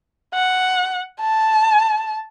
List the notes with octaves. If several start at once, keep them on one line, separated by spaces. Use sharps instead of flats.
F#5
A5